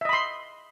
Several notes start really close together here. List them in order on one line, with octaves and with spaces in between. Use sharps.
E5 D#5 B5 C6